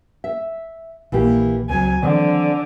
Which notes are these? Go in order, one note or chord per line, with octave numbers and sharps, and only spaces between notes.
E5
A#1 E3 A#3 G4
C#2 F#3 C4 G#5
D3 D#3 F3 G3 C4